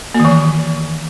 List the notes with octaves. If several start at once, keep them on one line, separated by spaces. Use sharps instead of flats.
A#3
D#3
E3